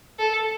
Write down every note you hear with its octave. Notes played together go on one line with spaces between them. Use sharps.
A4